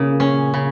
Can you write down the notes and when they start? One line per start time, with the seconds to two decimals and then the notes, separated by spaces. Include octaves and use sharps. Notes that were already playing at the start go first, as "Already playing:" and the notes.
Already playing: A#2 C#3 A#3
0.20 C#4
0.54 C#3